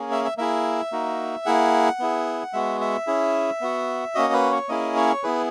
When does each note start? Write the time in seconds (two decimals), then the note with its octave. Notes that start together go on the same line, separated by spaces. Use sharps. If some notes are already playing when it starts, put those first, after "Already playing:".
Already playing: A#3 C#4 G#4
0.12 E5
0.25 E5
0.37 A#3 E4 G#4 E5
0.92 A#3 D#4 F#4
1.46 A#3 E4 G#4 F#5
2.00 B3 E4 G#4
2.53 G#3 B3 F#4 E5
2.81 E5
3.07 C#4 E4 G#4
3.61 B3 F#4
4.15 A#3 C#4 F#4 D#5
4.33 B4
4.51 C#5
4.69 A#3 C#4 E4 G#4 D#5
4.96 C#5
5.23 B3 E4 G#4 B4